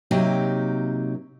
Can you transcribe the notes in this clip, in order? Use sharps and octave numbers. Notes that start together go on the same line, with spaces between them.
C3 F#3 A#3 D#4 G4